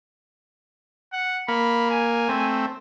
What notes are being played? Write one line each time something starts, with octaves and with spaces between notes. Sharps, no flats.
F#5
A#3 B5
G#5
A3 C4